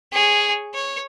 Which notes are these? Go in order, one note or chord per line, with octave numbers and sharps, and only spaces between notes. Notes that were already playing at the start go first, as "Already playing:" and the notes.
G#4 C#5
C#5